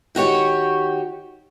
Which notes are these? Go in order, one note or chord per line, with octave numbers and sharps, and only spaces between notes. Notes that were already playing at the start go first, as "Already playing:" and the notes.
D#3 F#4 G4 C#5